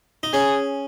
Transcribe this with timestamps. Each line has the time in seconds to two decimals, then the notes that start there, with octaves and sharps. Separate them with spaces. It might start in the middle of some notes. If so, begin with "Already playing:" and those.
0.23 D#4
0.33 C#4 G#4